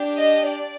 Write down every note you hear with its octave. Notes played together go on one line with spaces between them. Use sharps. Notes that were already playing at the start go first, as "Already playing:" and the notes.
Already playing: D4 G4
D#5
D5